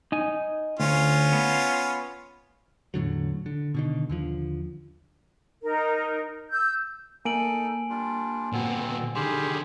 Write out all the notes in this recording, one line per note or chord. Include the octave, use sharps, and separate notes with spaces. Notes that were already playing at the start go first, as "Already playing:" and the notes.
D#4 G#5
D2 C#4 F4
B3
E2 A2 D3 F#3
D3
B2 D3 D#3
D#2 D3 F3
D#4 A#4
E6 G6
A#3 D#4 A4 G#5 D7 F#7
G3 D4 F4
A#2 D3 B3 C4 F#4
D3 D#3 G3 G4 G#4 C6